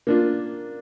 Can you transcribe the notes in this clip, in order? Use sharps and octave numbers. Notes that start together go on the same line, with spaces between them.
A#3 D4 F4